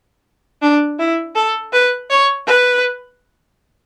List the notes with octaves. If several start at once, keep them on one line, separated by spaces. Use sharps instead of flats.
D4
E4
A4
B4
C#5
B4